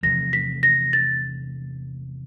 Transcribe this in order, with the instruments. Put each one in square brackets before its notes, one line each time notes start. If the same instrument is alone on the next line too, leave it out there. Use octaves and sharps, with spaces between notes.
[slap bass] E2 C3 F3 A3 [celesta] A#6
[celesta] B6
A#6
A6